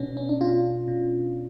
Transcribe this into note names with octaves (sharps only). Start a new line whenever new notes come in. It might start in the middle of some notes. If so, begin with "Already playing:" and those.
Already playing: B2 B3 C#4 D4
C#4
D4
B2 F4
B2